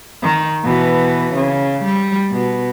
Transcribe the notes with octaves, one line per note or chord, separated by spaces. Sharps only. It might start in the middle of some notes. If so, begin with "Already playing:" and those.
D#3
B2 E3
C#3
G3
B2